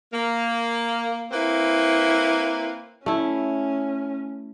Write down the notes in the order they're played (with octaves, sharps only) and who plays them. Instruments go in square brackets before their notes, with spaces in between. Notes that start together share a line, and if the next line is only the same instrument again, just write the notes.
[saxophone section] A#3
A#3 C4 E4 B4
[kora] A3 E4 [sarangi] C#4